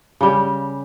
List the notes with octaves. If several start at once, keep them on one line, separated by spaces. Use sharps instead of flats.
C#3 G3